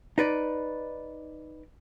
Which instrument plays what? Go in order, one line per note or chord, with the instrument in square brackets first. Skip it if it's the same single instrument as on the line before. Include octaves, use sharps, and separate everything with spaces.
[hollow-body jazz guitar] D#4 B4 D5